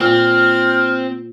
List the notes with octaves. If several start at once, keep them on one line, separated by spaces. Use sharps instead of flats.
A#2 C4 F6